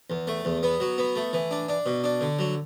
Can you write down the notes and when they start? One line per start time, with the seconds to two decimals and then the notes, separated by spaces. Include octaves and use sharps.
0.10 E2
0.27 A3
0.45 E2
0.63 B3
0.80 F#3
0.98 B3
1.16 A3
1.33 E3
1.51 D4
1.68 D4
1.86 B2
2.04 D4
2.21 D3
2.39 F#3